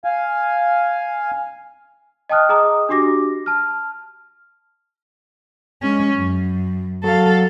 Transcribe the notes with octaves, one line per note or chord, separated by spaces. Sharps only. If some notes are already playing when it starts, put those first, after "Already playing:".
F5 G#5
D#5 G5 A5 D#6 F6 F#6
G#4 D#5 A#5 D#6
D4 F#4 G4 D6 A#6
A5 F6
G#3 C#4
F#2
F#3 A4 F5